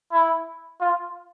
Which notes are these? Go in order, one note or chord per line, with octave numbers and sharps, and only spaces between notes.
E4
F4